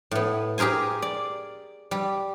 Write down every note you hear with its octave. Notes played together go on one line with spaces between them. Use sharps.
A2 B3
G4 G#4 A#4 C5 G#5
D5
G3